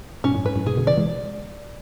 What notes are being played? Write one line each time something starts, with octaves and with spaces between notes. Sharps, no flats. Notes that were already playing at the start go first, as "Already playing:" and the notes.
G#2 B2 C#4
F#2 A2
G#2 B4
F#2 A2
G#2 B2 G#4
B2 D3
C#3 E3 D5
E3 G#3